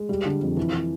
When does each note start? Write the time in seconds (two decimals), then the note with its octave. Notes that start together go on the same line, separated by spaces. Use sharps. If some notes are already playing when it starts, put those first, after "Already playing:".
Already playing: G#3
0.09 G3
0.25 D3
0.42 F2
0.57 E3
0.73 E3